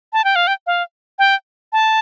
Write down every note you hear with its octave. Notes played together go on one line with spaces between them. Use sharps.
A5
G5
F5
G5
F5
G5
A5